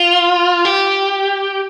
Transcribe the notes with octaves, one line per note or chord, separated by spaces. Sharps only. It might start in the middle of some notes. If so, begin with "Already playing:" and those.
Already playing: F4
G4